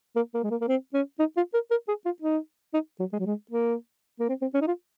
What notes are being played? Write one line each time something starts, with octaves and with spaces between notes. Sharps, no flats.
A#3
A#3
G#3
A#3
A#3
C4
C#4
D#4
F4
A#4
A#4
G#4
F4
D#4
D#4
F#3
G#3
F#3
G#3
A#3
A#3
C4
C4
C#4
D#4
F4